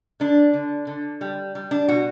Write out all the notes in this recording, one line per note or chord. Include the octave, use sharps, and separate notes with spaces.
D3 D4
D3
D3
G3
G3
D4
B2 F#4